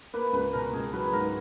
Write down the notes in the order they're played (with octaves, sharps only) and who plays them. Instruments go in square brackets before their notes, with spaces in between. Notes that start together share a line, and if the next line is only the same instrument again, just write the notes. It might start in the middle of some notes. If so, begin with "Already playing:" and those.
[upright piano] A#3 [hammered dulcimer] B4
[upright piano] C#2 [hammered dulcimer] B4
[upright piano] B2 [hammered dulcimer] A#4
[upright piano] C#2 [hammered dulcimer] G#4
[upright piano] F#3 [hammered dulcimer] B4
[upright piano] G#2 [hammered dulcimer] A#4